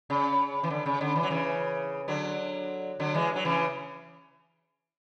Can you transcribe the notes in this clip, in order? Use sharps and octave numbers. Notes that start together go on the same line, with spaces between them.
C#3
E3
D3
C#3
D3
E3
F#3
C#3 E3
D3 F#3
D3 F#3
E3 G#3
F#3
C#3 E3